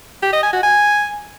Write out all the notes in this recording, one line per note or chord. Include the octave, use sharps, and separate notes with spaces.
G4
D#5
G#5
F#4
G#5